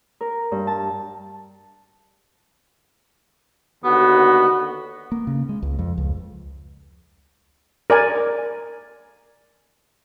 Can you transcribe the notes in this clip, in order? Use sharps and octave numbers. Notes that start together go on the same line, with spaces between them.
A#4
G2
A5
D#2 D3 B3 F#4
A#3
C#3
G#3
C#2
F2
C#2
A#4 D5 G#5